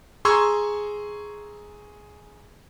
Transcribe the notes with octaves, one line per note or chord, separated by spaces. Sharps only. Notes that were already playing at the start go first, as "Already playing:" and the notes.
G#4 A#5 C6 C#6 E6 G#6